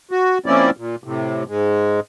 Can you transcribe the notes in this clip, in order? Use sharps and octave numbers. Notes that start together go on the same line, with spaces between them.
F#4
F3 A#3 C4 C#4 E4 D5
A#2
A2 C3
G#2 G#3